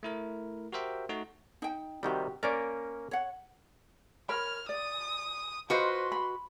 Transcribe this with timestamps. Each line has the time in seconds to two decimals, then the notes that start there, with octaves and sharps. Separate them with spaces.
0.03 A3 E4 A#4
0.72 F#4 G4 A#4 C5 E5 G5
1.09 A3 D#4 F#4
1.62 D#4 G5
2.03 C3 D#3 G3 F#4 G4
2.43 A#3 C#4 A#4 C5 D5
3.11 C#5 F#5
4.29 A#4 C#5 B5 F6
4.69 D5 D#6
5.70 F4 F#4 B4 C5 D#5 C6
6.12 B5